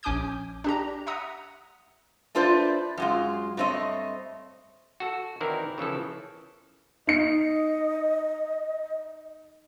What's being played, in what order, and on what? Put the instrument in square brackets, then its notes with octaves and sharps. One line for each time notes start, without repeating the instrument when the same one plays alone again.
[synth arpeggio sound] A#1 C#4 G#5 D6 D#6 G6
D4 G4 A#5
E5 F#5 A#5 D#6
[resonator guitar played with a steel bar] A3 D4 F4 B4 C5 D5
F#2 G#3 F4
G2 A3 C4 C#5 D#5
[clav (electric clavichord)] F#4 A4
D#3 E3 C4 E4 A#4 D5
C#3 E3 F3 A4
[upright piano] D#4 C#7 [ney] D#5